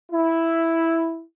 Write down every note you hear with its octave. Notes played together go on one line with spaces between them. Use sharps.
E4